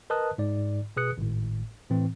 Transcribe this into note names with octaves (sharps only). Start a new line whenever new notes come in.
A#4 B4 D#5 A5 D#6 F#6
G#2 D5
B2 G#4 B4 D#6 F#6 C#7
G#1 A2
A2 E3 C4